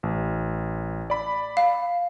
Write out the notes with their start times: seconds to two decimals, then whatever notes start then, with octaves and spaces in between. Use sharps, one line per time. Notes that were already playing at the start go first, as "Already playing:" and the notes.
0.03 A1
1.10 D5 B5
1.57 F5